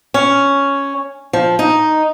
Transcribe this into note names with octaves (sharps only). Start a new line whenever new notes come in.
C#4
F3
D#4